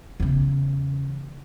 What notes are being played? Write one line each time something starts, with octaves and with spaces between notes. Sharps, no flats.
E2 C#3